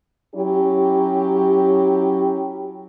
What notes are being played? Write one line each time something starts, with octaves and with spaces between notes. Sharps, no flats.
F#3 C#4 E4 G4